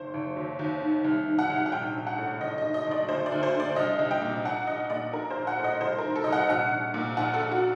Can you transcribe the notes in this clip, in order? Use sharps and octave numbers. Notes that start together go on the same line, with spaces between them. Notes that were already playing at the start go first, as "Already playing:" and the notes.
Already playing: F#1 D#3 C5
F#1
D#2
D#2
D#3
C2
D#3
F#5
C2
F#5
A#1 G5
A#1
F#5
A2
F#1 D#5
D#5
D#3
D#5
F#1
D5
D2 C5
D5
D2
C5
D3
D5
C2 D#5
C2
G5
A#2
A#1 F#5
A#1 D#5
A#2 D5
A#1 A#4
C5
A#1
F#5
A2
D#5
C2 C5
D#3 A#4
A4
C2 D#5
F#5
A#1 F#5
A#1
A#2
A#1 F#5
A4
A#1
F#4